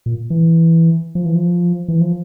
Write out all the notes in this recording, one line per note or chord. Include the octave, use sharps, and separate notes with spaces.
A#2
E3
F3
E3
F3
E3
F3